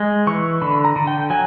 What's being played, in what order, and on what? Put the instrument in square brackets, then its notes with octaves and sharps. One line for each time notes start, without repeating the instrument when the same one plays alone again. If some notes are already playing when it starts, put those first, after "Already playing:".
Already playing: [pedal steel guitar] G#3
E3 C#6
D3 B5
A#5
D3
G5
F#3 G#5